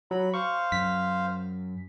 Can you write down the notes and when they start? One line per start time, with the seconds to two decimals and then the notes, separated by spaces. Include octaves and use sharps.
0.11 F#3 B5
0.34 C5 F5 C#6
0.72 F#2 B6